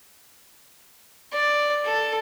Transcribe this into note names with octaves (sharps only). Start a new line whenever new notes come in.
D5
A4